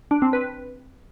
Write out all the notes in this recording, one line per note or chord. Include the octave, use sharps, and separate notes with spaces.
D4
C4
B4